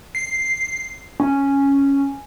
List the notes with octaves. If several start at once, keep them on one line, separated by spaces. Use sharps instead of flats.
C7
C#4